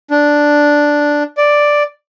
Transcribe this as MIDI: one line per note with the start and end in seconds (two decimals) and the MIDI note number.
0.11 1.23 62
1.37 1.83 74